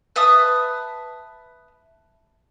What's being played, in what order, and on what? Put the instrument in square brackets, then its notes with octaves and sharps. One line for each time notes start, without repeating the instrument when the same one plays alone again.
[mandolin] B4 E5 A5 D#6